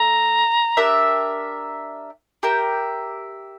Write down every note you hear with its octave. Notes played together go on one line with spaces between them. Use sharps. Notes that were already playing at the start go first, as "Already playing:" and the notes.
Already playing: A3 A#5
D4 G4 A#4 E5
G4 A#4 E5 G5